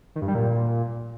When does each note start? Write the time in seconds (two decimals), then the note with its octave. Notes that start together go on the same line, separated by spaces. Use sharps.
0.16 D#3
0.22 G2
0.28 G3
0.35 A#2